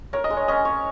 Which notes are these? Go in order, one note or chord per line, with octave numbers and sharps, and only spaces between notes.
A#4 C#5
D#5
G#3
C#5
C#4 D#5
C#5